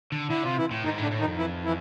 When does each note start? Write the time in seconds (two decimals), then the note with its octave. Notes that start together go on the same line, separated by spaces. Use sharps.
0.12 D3
0.30 D3 E4
0.43 C3 F4
0.57 E3 E4
0.71 A2
0.84 G#2 D#3 D#4
0.98 A2 D3 D4
1.11 A2
1.19 D#3 D#4
1.24 F2
1.38 E3 E4
1.65 E3 E4